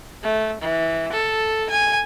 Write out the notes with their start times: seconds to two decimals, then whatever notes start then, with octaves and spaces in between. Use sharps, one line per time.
0.23 A3
0.62 E3
1.13 A4
1.70 G#5